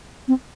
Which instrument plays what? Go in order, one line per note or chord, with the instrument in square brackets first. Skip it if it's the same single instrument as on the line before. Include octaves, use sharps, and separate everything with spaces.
[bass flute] C4